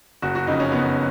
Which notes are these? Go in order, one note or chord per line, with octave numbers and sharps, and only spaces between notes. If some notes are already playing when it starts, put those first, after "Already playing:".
F#1 F#4
F#4
F2 C#3 D#4
C#4
F#1 B3